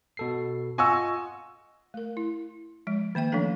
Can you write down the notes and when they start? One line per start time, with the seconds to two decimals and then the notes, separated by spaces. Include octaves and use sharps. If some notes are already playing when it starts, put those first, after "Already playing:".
0.17 B2 A4 C7
0.78 F4 D#5 F#5 G#5 C#6 E6
1.94 A3 A#4
2.17 E4
2.87 F3 G#3
3.15 D#3 A#3 E5 G5
3.32 F3 A3 C#4 D4 A4